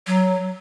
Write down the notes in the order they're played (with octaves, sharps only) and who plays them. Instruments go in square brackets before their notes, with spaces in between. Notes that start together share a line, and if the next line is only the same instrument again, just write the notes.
[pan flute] F#3